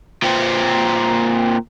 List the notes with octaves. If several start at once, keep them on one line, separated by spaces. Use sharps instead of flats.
A#2 C4